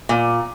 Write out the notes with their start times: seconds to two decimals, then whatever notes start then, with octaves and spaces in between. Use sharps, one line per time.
0.09 A#2